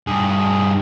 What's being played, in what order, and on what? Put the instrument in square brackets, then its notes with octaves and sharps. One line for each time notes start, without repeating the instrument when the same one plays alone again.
[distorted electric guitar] G2 G#4